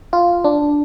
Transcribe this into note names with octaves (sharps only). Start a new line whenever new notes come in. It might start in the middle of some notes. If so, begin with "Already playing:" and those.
F4
D4